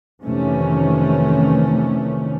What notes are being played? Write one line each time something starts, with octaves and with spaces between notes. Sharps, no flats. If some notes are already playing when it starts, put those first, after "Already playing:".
F2 C3 D#3 E3 A3 C#4